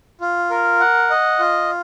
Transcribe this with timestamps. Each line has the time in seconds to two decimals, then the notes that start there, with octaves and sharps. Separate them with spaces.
0.21 F4
0.50 A#4
0.80 F#5
1.10 D#5
1.39 F4